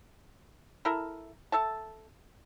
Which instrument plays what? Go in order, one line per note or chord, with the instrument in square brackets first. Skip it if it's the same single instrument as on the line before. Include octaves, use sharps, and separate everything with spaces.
[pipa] E4 A4 A#4
A4 E5 A5